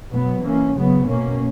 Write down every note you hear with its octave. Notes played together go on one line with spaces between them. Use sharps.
B2 F#3 B3
E3 A#3 C#4
C#3 F#3 B3
B2 A#3 C#4